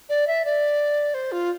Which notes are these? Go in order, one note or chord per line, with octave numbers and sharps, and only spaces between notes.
D5
E5
D5
C5
F4